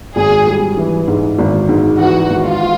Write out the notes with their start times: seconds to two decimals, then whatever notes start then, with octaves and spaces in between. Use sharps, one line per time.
0.16 G#1 G#4
0.47 G3
0.77 E3
1.07 G#2
1.39 G#1
1.69 G#2
1.99 E3 F#4
2.29 G#1
2.45 F4